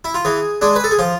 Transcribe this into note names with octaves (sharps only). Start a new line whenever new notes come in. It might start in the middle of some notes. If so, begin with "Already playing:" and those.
E4
F4
E3 G#4
G#3 D4 G#4
B4
A4
G#4
F3 F4